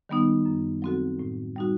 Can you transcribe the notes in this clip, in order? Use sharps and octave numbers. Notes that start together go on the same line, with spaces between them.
D#3 G3 B3 D#4
F#2
F#3 C4 F#4 A4
A2
G3 D#4 F#4